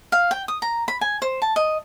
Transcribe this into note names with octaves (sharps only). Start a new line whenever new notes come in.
F5
G5
D#6
A#5
B5
G#5
C5
A5
D#5